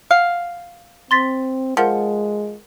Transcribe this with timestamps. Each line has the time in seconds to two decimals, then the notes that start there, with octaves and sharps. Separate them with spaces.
0.11 F5 F#5
1.11 C4 C6 A6 B6
1.77 F3 G#3 A#4 F#5